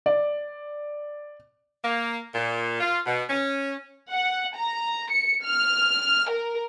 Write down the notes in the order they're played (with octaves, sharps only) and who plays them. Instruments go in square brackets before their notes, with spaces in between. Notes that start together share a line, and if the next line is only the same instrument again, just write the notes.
[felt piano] D5
[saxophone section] A#3
A#2
F4
B2
C#4
[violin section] F#5
A#5
C#7
F6
A#4